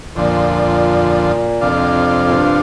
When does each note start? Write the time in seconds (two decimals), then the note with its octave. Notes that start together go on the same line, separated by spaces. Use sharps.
0.16 F2 A#2 D3 F3
1.61 F2 C3 F3 D4 F4
2.27 A#2
2.34 G2